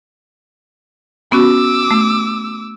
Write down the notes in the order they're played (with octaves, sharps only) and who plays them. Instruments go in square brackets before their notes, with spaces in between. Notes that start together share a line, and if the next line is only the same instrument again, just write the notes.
[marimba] B3 C#4 F#4 [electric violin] D6 E6
[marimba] A3